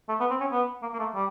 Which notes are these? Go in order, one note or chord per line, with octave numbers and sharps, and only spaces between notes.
A3
B3
C4
C#4
B3
A#3
A#3
A3
G3